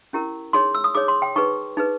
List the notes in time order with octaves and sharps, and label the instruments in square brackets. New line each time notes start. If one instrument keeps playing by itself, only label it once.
[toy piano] C#4 E4 G4 A#4
D#4 G#4 C#5 C6
E6
D#6
D#4 G#4 C#5 D6
C6
G5
D#4 G#4 B4 C#6
D#4 G#4 B4